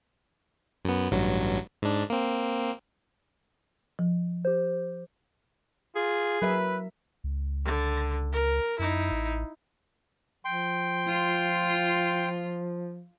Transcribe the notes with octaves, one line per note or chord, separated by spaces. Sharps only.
F#2 B3
A1 G2 F#3
G#2 D4
A#3 C4
F3
G4 C5
F4 G#4
F#3 A#4 B4 E5
C#2
D3
A#4
F#2 D#4 E4
A1
F3 G5 C6
F4